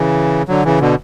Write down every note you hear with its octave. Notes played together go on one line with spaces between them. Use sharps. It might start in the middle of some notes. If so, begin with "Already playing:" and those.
Already playing: C#3 E3
D3 F#3
C#3 E3
B2 D3